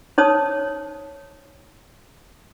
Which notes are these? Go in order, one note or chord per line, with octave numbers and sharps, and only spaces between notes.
D#4 C5 C#5 A5 D#6